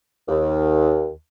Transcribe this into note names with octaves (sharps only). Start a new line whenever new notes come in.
D#2